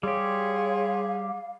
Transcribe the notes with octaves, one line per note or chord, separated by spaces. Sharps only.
G3 G4 G#4 C#5 F5 C6